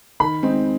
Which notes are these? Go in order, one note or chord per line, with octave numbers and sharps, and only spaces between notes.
D#3 B5
G#3 C4 D#4